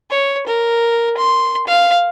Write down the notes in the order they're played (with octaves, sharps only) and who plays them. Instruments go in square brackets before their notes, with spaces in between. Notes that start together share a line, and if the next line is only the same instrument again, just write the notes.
[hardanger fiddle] C#5
A#4
C6
F5